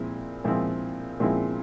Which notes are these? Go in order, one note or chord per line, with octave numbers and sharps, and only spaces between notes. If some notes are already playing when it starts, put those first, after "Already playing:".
Already playing: A#2 F3 G#3 C4 E4
A#2 F3 G#3 C4 E4
A#2 F3 G#3 C4 E4